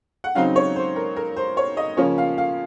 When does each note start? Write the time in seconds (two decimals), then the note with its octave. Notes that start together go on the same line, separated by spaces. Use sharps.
0.24 F#5
0.35 C#3 F#3 C4 D#4 F5
0.56 C#5
0.76 C5
0.96 A#4
1.16 A#4
1.36 C5
1.57 C#5
1.77 D#5
1.97 C#3 F3 A#3 C#4 C#5
2.18 F5
2.38 F5